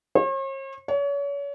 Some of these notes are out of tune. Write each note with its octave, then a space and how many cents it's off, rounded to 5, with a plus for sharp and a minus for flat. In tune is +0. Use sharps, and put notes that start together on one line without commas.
C#5 -45
C#5 +35